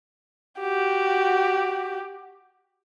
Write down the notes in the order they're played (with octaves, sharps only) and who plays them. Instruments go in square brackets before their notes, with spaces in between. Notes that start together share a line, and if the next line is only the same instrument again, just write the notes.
[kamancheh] F#4 G4